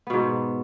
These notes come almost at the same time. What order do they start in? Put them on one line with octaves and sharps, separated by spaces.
B3 B2 G#2